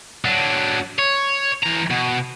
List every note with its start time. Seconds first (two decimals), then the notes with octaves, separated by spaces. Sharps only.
0.25 F#3 D4
0.99 C#5
1.63 E3 A#5
1.90 B2